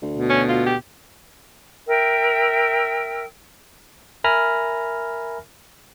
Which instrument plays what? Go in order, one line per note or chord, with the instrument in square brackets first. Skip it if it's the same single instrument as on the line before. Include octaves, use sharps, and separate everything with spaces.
[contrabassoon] D2
[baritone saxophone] B2
[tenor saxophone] C#4
F4
G4
[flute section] A#4 E5 G5 E6
[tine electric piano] A#4 E5 G#5 B5 F6 A#6